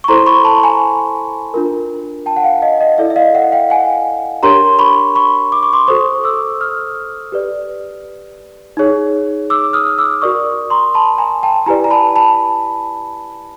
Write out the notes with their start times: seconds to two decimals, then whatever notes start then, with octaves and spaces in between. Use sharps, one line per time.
0.04 C#6
0.08 E4 A4 C5 A#5 C6
0.26 B5 C#6
0.44 A5 B5
0.63 G#5 A#5
1.54 D4 F4 A#4
2.26 G5 A5
2.36 F#5
2.43 F5 G5
2.62 D#5 F5
2.81 D#5
2.98 E4 A4 D5 E5
3.10 E5
3.16 D#5 F5
3.35 E5 F#5
3.52 F5 G5
3.70 F#5 G#5
4.43 D4 G4 A#4 C#5 A#5 C6
4.79 B5 C#6
5.15 B5 C#6
5.52 D6
5.63 C#6
5.73 C6 D6
5.87 F#4 A4 C5 C#6 D#6
6.23 D6 E6
6.61 D#6 F6
7.32 G4 B4 D5
8.77 D#4 G#4 C#5
9.50 D6 E6
9.73 D#6 F6
9.98 D6 E6
10.22 F#4 A#4 D5 C#6 D#6
10.70 A#5 C6
10.94 A5 B5
11.18 G#5 A#5
11.43 G5 A5
11.66 E4 G4 B4 D5 G#5 A#5
11.84 A#5
11.91 A5 B5
12.16 A5 B5